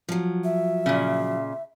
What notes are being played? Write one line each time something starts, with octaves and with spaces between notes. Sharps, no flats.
F3 F#3
E5
A#2 C#3